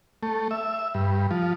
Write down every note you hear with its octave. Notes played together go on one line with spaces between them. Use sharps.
A3
E5
G2
F3